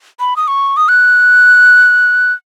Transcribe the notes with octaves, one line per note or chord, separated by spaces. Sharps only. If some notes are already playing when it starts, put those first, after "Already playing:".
B5
D#6
C#6
D#6
F#6